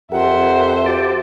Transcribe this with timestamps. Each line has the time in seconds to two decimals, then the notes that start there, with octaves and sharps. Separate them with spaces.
0.12 F2 G4 A#4 C5 E5 F#5
0.86 F#4 G4 A5 D6